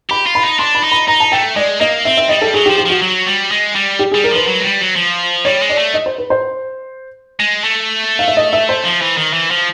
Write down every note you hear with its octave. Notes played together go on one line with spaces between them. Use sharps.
G4 B5
F4
B5
D#4
D4 C6
B5
D#4
B5
D#4 A#5
A5
A3 G5
G#3 D5
A#3 D#5
C4 E5
E5
G3 D#5
A4
F#3 G#4
G4
F3
G4
F3 F#4
F#3
G3
G#3
G3
G4
G3 G#4
A#4
F3 B4
F#3
G#3
G3
F#3
F3
G3 C#5
G#3
D5
A3
D#5
C5
B4
C5
G#3
A3
F5
E5
D#5
E5
C5
F3
E3
D#3
E3
F3